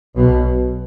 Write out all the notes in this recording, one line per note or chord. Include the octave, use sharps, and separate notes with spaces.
B1 B2